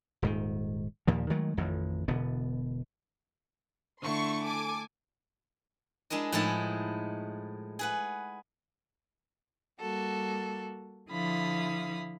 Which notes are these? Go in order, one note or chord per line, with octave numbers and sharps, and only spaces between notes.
D#1 G#2 D#3
D#2 A#2 F3
D#3 F#3 G#3 A3
A1 F2 D#3
E1 B2 D3 B3
D3 A3 E4 C6 C#6
A4 G#5 D6
G#3 D4 E4 A#4 D#5
A2 F3 G#3 D#4 E4 A5
G#4 B4 F#5
G3 A#3 F#4 A4
D3 F3 E4 F5 B5 D#6